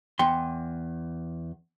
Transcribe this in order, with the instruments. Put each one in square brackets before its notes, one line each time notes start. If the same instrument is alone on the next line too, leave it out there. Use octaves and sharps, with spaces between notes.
[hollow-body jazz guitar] E2 C6 [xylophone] G5